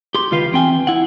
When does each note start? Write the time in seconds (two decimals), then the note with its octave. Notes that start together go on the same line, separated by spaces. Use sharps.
0.15 G4 C6
0.31 C#2 D#3 F4 G4 B4 F5
0.52 E2 C4 G5 G#5
0.87 E4 F#5